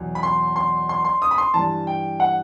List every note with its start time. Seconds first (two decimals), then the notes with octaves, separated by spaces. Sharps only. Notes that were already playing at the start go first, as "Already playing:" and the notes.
Already playing: E2 B2 F#3
0.15 B5
0.23 C6
0.56 C6
0.89 C6
1.05 C6
1.22 D#6
1.31 B5
1.38 C6
1.54 G2 E3 A5
1.87 G5
2.20 F#5